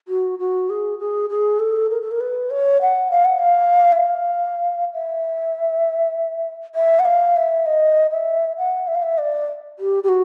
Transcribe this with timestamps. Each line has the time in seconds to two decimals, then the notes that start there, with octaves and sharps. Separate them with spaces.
0.08 F#4
0.39 F#4
0.70 G#4
0.99 G#4
1.30 G#4
1.59 A4
1.91 A#4
2.01 A4
2.11 A#4
2.21 B4
2.50 C#5
2.82 F#5
3.11 F5
3.25 F#5
3.39 F5
3.92 E5
4.03 F5
4.93 E5
6.75 E5
6.99 F#5
7.06 F5
7.36 E5
7.66 D#5
8.11 E5
8.58 F#5
8.87 E5
8.95 F5
9.03 E5
9.18 D5
9.79 G4
10.04 G4
10.09 F#4